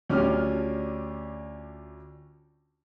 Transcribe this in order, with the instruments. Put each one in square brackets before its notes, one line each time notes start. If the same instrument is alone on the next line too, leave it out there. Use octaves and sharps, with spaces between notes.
[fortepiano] D2 C#4 D4 F4 G4 F6